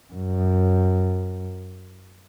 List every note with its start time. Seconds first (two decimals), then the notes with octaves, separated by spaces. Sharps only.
0.14 F#2